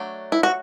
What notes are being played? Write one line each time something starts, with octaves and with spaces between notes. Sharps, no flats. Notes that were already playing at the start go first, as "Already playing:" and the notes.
Already playing: F#3 A3 D4
E4
F#4